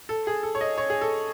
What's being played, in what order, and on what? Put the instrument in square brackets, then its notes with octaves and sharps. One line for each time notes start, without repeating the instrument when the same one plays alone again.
[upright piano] A4
G#4
A4
C#5
D#5
C#5
G#4
A4